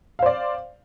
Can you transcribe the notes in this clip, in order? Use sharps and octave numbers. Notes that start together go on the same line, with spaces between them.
C5 D5 F5